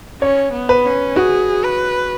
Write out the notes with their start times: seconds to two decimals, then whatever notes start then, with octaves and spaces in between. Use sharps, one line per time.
0.22 C#4 C#5
0.53 B3
0.69 B4
0.85 C#4
1.16 F#4 G#4
1.64 B4